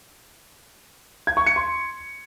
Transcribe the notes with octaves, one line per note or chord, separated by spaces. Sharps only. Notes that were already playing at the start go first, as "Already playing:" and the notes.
G#6
C#6
C#7
C6